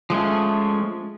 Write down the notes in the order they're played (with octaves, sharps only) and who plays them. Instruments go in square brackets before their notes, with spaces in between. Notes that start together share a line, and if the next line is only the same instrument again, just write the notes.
[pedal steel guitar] F3 G#3 A3 C#4